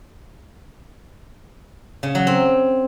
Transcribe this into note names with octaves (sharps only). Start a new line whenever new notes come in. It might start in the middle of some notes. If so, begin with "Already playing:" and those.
C#3
F#3
C4